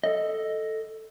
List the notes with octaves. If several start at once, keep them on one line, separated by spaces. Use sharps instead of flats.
A4 D#5